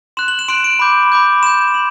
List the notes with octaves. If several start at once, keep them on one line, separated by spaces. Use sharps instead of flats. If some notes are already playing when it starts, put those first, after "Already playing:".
C6 F#6 E7
F#7
E7
C6 F#6 D7
D7
B5 D6 G6
B5 D6 G6
C6 G6 E7
C6